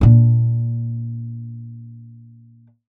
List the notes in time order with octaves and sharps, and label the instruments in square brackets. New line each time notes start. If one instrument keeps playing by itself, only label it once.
[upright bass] A#2 D4